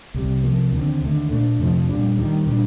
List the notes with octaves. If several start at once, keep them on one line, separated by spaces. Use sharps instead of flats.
C2 C3 G3
C3 F3 A#3
D#2 D3 A3 C4
D#2 D3 A3
A#2 A3 D4
F2 C3 F3
A#2 G3 D4
D#2 D#3 G3
A#2 G3 D4